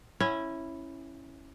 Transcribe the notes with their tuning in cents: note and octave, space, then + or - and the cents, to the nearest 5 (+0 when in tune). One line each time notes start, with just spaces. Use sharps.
C#4 -15 E4 +0